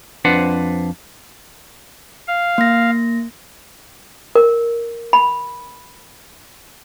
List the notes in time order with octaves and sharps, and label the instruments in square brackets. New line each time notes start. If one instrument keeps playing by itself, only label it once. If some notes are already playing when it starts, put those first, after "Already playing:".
[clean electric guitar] F2 D4 B4 C5 F#5
[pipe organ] F5
[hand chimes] A#3 A#6
[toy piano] A#4
B5